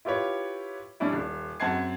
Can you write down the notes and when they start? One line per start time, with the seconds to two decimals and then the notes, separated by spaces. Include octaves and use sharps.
0.05 E4 F4 G4 B4 C#5
1.00 G3 C#4 D4 E4
1.13 D#1
1.60 F#2 C4 F#5 A5 G#6 C7